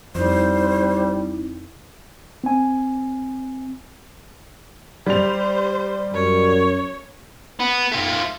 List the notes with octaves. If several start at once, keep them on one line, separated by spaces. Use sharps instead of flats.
F2 G3 C4 D#4 E4 C5
C4 G#5
G3 C5 F7
F#2 C#5
B3
A3 F4